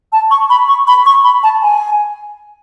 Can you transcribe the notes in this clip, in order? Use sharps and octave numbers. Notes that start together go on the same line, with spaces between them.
A5
C#6
B5
C#6
B5
C#6
B5
A5
G#5